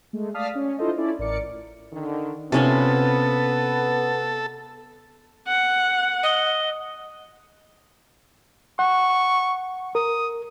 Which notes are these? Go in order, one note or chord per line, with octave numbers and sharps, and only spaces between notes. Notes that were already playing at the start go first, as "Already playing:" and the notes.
G#3 A3
D5 F5 A5 D#6 F6 B6
C#4
D4 E4 F4 A4 C5 D#5
C#4 E4 A4 D5
A1 A#4 D5 D6 C#7
D3 D#3
C3 B3 C#4 F4 A4
F#5
D#5
F#5 C#6
A#4 D#6